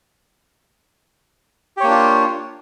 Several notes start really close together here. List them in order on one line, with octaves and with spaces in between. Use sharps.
G4 C#5 A#3 D4 F4